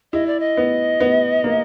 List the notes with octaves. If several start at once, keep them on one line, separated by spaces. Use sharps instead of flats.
E4 D#5
D5
D#5
B3
B3
A#3